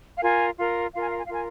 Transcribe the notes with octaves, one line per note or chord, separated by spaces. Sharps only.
F5
F4 A#4 G#5
F4 A#4
F4 A#4 F5
G#5
F5
G#5
F5
F4 A#4 G#5